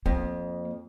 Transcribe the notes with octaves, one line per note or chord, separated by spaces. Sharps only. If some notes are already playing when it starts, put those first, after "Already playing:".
F2 A#3